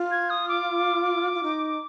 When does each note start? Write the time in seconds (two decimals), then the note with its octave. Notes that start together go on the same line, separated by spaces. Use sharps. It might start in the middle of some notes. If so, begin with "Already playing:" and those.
Already playing: F4
0.11 G#6
0.30 D#6
0.49 D6
1.34 F4
1.43 D#4